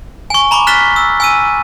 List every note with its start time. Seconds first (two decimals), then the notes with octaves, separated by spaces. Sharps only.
0.30 G#5 C#6
0.51 A#5 B5 C#6 D6
0.67 F6 F#6 A6 B6 E7 G7
0.96 E6
1.20 G#5 E6 D#7